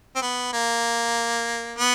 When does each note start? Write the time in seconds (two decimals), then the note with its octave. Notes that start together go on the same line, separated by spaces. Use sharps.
0.16 C4
0.22 B3
0.53 A#3
1.79 B3